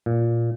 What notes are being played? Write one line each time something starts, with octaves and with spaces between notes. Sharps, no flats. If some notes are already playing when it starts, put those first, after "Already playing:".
A#2